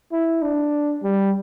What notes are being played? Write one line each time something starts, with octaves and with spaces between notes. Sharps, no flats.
E4
D4
G3